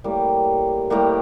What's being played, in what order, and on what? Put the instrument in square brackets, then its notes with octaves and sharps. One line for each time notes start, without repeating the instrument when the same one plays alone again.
[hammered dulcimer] A2 G3 A#3
A2 G3 A#3